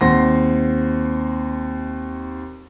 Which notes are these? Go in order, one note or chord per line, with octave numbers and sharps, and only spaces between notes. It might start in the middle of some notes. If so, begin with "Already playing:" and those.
D#2 C4 F#5 C6 A#6